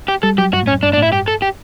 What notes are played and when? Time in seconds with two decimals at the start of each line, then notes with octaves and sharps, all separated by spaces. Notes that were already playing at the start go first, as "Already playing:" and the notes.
0.08 G4
0.23 G3 A4
0.38 F#3 G4
0.53 G2 F#4
0.63 A2
0.67 C#4
0.73 F#2
0.83 G2 D4
0.93 D4
0.97 A2 E4
1.12 G2 G4
1.28 A4
1.42 G4